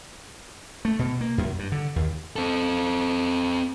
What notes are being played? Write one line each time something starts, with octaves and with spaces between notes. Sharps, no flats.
A3
B2
A#3
F#2
G2
D3
D#2
C4 A4